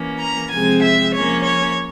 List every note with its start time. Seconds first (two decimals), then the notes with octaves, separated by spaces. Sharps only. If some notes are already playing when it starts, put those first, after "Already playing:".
Already playing: E3 A#3 C#4
0.19 A#5
0.51 C3 F3 G#3 C4 G#5
0.82 E5
1.13 F3 A#3 C#4 C#5
1.45 C#5